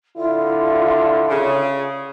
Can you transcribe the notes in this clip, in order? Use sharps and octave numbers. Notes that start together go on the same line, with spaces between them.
D3 E4 F4
C#3